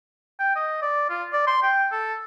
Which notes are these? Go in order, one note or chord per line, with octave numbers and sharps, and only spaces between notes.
G5
D#5
D5
F4
D5
C6
G5
A4